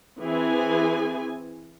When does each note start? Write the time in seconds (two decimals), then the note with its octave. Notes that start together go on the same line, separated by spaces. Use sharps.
0.20 E3 C4 G#4 G#5